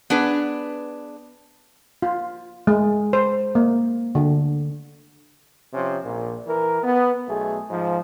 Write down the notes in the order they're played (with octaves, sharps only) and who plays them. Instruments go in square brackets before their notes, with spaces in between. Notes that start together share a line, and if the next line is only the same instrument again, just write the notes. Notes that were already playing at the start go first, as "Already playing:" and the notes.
[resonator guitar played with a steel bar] B3 D4 G#4 B4
[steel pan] F4
G#3
C5
A#3
D3
[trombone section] C3 F3 C#4
A#1 A#2
E3 A#4
B3
B1 A3 G#4
G#2 F3